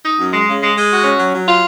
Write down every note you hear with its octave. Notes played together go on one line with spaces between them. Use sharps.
D#4
F#2
G#3
C#3
G#3
G#3
F#4
C#4
F#3
F#3
F4